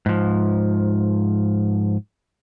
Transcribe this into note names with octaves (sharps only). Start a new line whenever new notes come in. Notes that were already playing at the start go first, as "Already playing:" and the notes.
G#2 F3